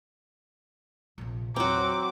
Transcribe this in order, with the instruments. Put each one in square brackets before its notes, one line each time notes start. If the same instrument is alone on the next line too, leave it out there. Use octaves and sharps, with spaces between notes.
[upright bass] A#1 C3
[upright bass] E2 [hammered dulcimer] F#3 A#5 [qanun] C4 F#4 [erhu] D6